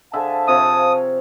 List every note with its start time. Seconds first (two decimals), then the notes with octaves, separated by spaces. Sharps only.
0.13 D3 G#4 C5 E5 F5 A5
0.48 C3 F3 C#5 D#6